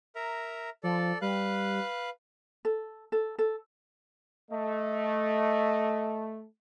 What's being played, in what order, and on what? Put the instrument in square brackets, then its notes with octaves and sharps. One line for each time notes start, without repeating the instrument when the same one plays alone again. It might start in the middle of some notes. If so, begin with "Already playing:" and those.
[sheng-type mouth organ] A#4 E5 A#5
[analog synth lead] F3 [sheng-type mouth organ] A4 D5
[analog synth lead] G3 [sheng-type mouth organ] B4 F5 F#6
[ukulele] A4
A4
A4
[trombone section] A3 [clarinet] D#5